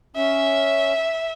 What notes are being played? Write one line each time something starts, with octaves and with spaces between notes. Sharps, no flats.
C#4 E5